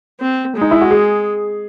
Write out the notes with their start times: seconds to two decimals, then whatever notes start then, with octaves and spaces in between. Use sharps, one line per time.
0.20 C4
0.56 G#3
0.61 D#4
0.71 E4
0.82 F#4
0.91 G#4